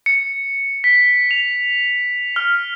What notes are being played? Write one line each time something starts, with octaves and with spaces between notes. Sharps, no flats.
C#7
B6
F7
F6